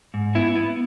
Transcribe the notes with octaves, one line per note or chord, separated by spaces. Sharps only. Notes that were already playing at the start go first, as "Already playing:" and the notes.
G#2
B3 E4
B3